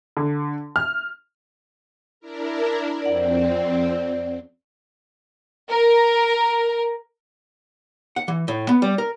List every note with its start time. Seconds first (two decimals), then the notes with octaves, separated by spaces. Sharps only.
0.17 D3
0.76 F6
2.20 D4 E4 A#4
3.02 F2 C4 D5 F#5
5.69 A#4
8.16 F#5
8.28 E3
8.48 A2
8.69 B3
8.82 G3
8.98 A#4